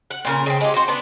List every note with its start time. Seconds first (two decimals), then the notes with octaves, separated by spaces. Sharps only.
0.11 F#5
0.25 A#2 C#3 A#4
0.46 C#3 C4
0.61 G#3 F4 G4
0.74 F#4 C5
0.88 B3 D4